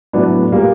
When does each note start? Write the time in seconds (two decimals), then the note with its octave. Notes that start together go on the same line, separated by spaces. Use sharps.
0.13 A2 F#3 B3 D4
0.52 A#2 G3 A#3